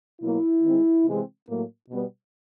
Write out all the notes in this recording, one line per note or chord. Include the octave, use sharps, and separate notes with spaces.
B2 F#3 A#3 E4
D#3 G#3 C4
C3 E3 G#3 C4
A2 F#3 A#3
B2 G3 B3